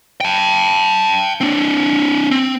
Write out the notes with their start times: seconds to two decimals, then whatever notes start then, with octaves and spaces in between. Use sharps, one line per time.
0.21 G5 A5
1.41 C4 D4
2.31 C4